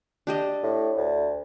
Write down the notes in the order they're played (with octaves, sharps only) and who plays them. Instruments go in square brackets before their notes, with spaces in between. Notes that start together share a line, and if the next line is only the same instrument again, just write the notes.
[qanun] D4 G4 D#5
[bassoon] A2
D2